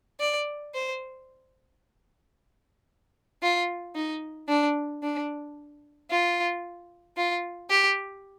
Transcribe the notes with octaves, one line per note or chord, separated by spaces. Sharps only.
D5
C5
F4
D#4
D4
D4
F4
F4
G4